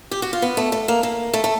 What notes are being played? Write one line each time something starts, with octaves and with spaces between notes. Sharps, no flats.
G4
F#4
F4
B3
A3
A3
A#3
A#3
A3
A3